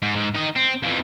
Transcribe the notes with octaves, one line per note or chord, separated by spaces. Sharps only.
G#2
G#2
D#3 D#5
C4
F2 E3